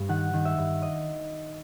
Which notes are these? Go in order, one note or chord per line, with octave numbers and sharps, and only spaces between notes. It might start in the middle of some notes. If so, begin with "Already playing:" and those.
Already playing: G2
D#3 F#5
D#3
E5
G2
D#5